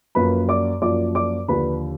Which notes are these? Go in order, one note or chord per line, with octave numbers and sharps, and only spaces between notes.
F#2 F3 A#3 B4 B5
D5 D6
F#2 F3 A#3 D5 D6
D5 D6
D#2 D3 F3 B4 B5